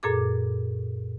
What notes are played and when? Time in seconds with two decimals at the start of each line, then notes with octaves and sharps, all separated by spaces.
0.03 F#2 A#2 G#4 A4 D6